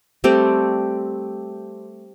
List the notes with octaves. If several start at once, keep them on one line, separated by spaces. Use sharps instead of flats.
G3 A3 C4 G4